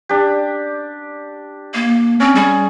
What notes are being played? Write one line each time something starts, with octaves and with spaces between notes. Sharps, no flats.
D4 G4
A#3
C4 C#4
G3 G#4